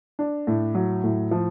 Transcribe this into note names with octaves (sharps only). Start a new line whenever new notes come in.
D4
A2
F#3
A2
F3